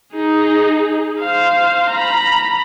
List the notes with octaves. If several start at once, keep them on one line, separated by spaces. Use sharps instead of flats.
D#4 G#4
C5 F5
A#5 B5